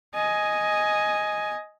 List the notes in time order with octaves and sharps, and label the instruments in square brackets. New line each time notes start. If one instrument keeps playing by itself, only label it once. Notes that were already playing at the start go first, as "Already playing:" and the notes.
[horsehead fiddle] D#5 G#5